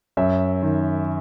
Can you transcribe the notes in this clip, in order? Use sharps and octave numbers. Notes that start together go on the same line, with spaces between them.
F#2 E5
D#3